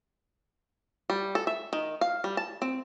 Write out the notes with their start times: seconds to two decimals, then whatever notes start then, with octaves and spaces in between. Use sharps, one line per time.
1.10 G3
1.35 A4
1.47 E5
1.73 D#3
2.01 F5
2.24 G3
2.37 A5
2.62 C4